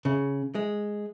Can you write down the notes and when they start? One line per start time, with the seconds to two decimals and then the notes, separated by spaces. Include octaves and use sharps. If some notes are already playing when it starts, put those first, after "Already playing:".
0.05 C#3
0.55 G#3